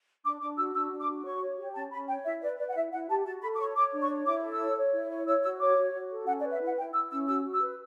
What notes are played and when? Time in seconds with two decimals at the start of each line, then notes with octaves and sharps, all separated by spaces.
0.24 D4 D6
0.41 D4 D6
0.57 F#4 E6
0.74 D4 E6
0.91 D4
0.99 D6
1.08 F#4
1.25 C#5 C#6
1.41 C#5
1.58 G4
1.75 C#4 A5
1.92 C#4 B5
2.08 C#5 G5
2.25 E4 E5
2.42 B4 D5
2.59 B4 D5
2.68 F#5
2.75 E4 E5
2.92 E4 F#5
3.09 G4 A5
3.25 F#4 A5
3.42 A4 B5
3.55 D6
3.59 C#5 C#6
3.76 C#5 D6
3.92 D4
4.01 C#6
4.09 C#5
4.26 E4 D6
4.43 A4
4.51 E6
4.59 C#5
4.77 C#5
4.93 E4
5.10 C#5
5.26 C#5 E6
5.43 F#4 E6
5.60 C#5 D6
5.77 F#4
5.94 F#4
6.10 A4
6.27 C#4 F#5
6.40 D5
6.44 B4
6.52 E5
6.61 E4 F#5
6.77 E4 G5
6.94 E4 E6
7.11 C#4 E6
7.27 F#4 E6
7.44 F#4
7.53 E6
7.61 B4